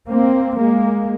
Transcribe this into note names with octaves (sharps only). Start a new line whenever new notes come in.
A#3 C4
G#3 A#3